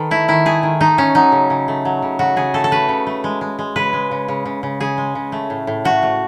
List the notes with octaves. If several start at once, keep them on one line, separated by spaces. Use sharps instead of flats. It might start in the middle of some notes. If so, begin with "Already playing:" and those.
Already playing: D#3 A4 B4
A3 E4
D#3 E4
A3 G#4
D#3
A3 D#4
A3 C#4
F#3 D#4
C#3
C#3
A3
F#3
C#3
C#3 F#4
C#3 G#4
A3 A4
A4
A3 B4
C#3
A3
G#3
G#3
G#3
C#3 B4
G#3
C#3
C#3
C#3
C#3
C#3 G#4
G#3
C#3
A3
A2
A2
A3 F#4
A3